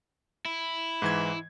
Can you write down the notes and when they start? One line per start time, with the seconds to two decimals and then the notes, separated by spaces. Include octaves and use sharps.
0.45 E4
1.02 G#2 E3 G#6